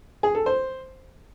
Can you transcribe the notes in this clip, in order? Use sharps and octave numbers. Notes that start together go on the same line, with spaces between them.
G#4
A4
C5